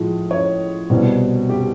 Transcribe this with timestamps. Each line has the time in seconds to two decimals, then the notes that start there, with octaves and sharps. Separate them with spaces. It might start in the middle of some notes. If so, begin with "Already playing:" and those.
Already playing: A2 F3 G#3
0.31 C#5
0.90 C2 B2 G3 C4
1.49 G4